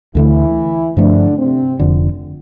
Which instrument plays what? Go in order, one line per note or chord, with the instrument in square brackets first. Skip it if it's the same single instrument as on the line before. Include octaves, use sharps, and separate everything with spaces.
[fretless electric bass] D2 D3 A3 [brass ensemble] E3 E4
[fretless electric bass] G2 F3 A3 [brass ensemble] D3 D4
[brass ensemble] C3 C4
[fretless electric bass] F1 F2 D3